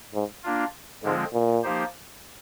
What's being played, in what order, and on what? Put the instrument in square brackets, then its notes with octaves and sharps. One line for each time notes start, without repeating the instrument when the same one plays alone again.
[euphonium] G#2
[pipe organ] A#3 D4 F4
[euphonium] G#2 [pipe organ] D3 F3 G#3 C4 F4
[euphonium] A#2
[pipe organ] F3 A#3 D#4 G4 C5